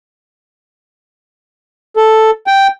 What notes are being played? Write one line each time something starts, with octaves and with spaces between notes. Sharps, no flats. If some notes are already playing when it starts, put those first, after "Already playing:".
A4
G5